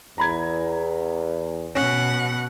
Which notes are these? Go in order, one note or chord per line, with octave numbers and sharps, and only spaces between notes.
E2 A#5 B5 G#6
B2 C#4 F#5